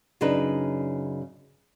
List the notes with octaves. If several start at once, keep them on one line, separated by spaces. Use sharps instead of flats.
F#2 C#3 D4 D#4 B4